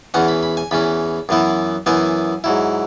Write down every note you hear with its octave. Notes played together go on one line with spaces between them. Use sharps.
E2 E3 C#4 F#5
B5
B5
G#5
E2 E3 C#4 B5
F#2 E3 B3 E4
F#2 E3 B3 E4 G#5
G#2 F#3 E4